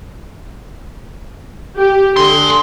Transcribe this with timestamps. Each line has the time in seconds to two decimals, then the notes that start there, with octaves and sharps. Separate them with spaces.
1.77 G4
2.17 D3 G#5 C6